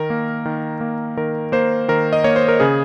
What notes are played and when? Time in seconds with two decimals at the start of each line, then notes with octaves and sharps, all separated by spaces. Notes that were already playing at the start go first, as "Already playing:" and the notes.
Already playing: D#3 A#4
0.10 A#3
0.45 D#3
0.81 A#3
1.17 D#3 A#4
1.52 A#3 C5
1.88 D#3 A#4
2.13 D#5
2.24 A#3 C#5
2.36 C5
2.48 A#4
2.60 C#3 G#4